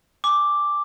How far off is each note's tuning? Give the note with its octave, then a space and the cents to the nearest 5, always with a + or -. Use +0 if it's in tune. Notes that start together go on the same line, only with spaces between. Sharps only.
G#5 -10 D6 +0